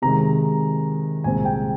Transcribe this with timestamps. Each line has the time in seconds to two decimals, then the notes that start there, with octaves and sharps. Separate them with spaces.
0.02 C3 D#3 G#3 A#5
1.24 C2 A#2 G#3 C4 G#5
1.45 G5